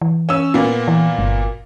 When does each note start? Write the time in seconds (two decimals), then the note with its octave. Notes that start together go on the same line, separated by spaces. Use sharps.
0.01 E3
0.29 C#4 E6
0.54 A#2 A#3 B3
0.88 E3
1.19 G1